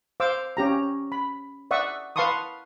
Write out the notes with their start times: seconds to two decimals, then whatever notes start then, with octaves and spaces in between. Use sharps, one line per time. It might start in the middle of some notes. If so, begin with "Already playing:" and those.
0.20 C5 F5 D6 E6
0.57 C#4 G4 A#5
1.12 B5
1.71 D5 E5 F#5 C#6 D#6
2.16 B4 F5 A5 C6 C#6 D#6